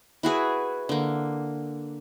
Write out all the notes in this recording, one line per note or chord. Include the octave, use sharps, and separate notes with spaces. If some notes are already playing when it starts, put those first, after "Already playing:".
E4 F#4 G#4 B4
D3 A#3